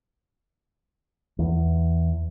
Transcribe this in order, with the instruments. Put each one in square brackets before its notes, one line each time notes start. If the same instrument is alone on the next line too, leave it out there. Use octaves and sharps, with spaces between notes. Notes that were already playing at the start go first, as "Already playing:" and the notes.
[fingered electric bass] E2